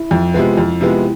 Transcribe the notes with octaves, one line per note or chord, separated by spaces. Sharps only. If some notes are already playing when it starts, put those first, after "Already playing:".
Already playing: E4
F2
C3 F3 G#3 B3
F2
C3 F3 G#3 B3